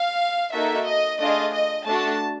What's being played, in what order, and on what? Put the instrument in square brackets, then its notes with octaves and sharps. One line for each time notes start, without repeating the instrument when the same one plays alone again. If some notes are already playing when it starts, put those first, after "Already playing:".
Already playing: [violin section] F5
A#3 D#4 F#4 A4 E5
D#5
A3 D4 F4 G#4 D#5
D#5
A3 D4 F#4 A5